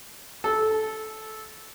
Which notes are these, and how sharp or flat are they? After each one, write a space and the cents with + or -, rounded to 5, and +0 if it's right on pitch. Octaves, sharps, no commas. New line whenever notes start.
A4 -15